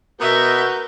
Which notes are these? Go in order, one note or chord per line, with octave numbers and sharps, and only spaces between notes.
B2 B3 F#4 A#4 B4 E5 G6